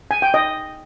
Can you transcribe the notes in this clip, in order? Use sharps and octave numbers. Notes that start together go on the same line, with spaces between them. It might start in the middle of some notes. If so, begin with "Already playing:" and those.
G#5
G5
D#5